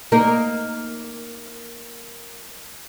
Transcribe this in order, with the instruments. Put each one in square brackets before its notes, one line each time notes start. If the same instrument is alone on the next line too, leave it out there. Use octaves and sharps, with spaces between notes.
[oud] A#3 D#4 A#4